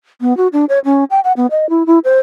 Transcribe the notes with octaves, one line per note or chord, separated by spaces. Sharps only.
B3
F#4
D4
C#5
C#4
G5
F#5
B3
D#5
E4
E4
C5